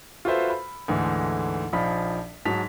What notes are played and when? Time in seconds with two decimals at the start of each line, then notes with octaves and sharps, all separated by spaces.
0.25 F4 F#4 A4 B4 C5 E5
0.50 B5
0.88 D2 G#2 E3 A3
1.73 A#1 F3 D#4 F5 B5 B6
2.45 G#2 F#3 A5 B6 F7